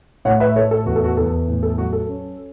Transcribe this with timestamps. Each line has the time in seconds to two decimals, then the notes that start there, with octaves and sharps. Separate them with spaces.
0.25 A2 C#5 F#5
0.40 B4 E5
0.56 A2 A4 C#5
0.71 A4
0.86 E2 F#4
0.96 A4
1.04 F#4
1.17 E2 A4
1.48 A2
1.63 A4
1.78 F#3 F#4
1.93 A4
2.08 C#4